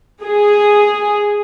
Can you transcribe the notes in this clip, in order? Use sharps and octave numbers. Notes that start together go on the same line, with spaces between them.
G#4